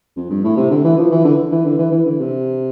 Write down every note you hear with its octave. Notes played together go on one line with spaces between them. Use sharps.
F2
G2
A2
C3
D3
E3
F3
E3
D3
E3
D3
E3
E3
D3
C3